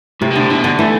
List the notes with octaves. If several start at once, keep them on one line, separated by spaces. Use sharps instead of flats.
A2 C3
B2
A2 D3
B2 E3
D3
E3 A3